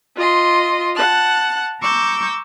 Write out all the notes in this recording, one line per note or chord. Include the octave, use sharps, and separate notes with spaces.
F4 D#5 C6
F#5 A5 F#6
A#5 C#6 D6 E6 G6